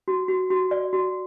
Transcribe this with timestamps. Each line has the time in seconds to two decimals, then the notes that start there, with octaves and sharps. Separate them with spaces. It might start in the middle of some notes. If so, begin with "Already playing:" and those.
0.08 F#4
0.28 F#4
0.50 F#4
0.71 D5
0.93 F#4